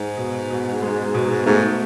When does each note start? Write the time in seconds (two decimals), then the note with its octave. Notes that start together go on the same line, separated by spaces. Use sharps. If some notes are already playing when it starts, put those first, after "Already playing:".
Already playing: G#2
0.17 B2
0.50 B2
0.82 G#3
1.14 B2
1.46 G#2 A3